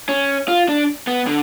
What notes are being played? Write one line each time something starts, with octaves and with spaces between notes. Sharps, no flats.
C#4
F4
D4
B3
D3